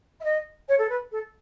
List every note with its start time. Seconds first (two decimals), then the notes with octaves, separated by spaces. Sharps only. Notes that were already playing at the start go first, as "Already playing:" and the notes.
0.20 E5
0.24 D#5
0.68 C#5
0.78 A4
0.89 B4
1.12 A4